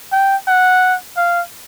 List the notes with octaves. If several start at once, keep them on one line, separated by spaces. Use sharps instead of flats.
G5
F#5
F5